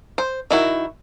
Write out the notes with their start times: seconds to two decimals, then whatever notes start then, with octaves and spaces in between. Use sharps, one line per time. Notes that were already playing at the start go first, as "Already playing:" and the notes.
0.18 C5
0.51 D#3 E4 F#4